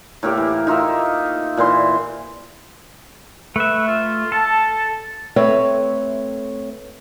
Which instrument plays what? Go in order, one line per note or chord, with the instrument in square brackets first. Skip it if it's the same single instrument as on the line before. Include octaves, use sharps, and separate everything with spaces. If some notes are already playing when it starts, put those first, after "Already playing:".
[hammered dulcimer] A2 A#3 G4
E3
D#4 F4 A#4 E5
A#2 E3 C5 C6
[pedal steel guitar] A3 E5 [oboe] B4
[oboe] F4
[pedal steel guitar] A4 [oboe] A5
[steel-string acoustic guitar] A3 C4 B4 C#5 E5